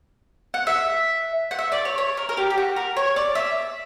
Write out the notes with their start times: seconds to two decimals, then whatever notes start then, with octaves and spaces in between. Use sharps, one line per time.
0.54 F#5
0.67 E5
1.51 F#5
1.59 E5
1.72 D5
1.85 C#5
1.98 C#5
2.17 A#4
2.29 A#4
2.37 G4
2.50 G4
2.58 F#4
2.76 A#4
2.97 C#5
3.16 D5
3.35 E5